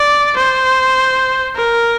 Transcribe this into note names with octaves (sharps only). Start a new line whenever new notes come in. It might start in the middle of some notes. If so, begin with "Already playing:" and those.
Already playing: D5
C5
A#4